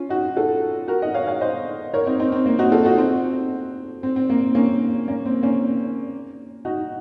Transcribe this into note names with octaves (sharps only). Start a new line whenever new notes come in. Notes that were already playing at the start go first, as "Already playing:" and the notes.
Already playing: C#4 F4
D#4 F#4
F4 A4
F#4 A#4
D#5 F#5
C#5 F5
C#5 F5
C5 D#5
A#4 C#5
C4 D#4
C4 D#4
C4
A#3
D#4 F#4
F4 A4
D#4 F#4
C4
C4
C4
A#3
A#3 C#4
A#3 C#4
C4
A#3 C#4
D#4 F#4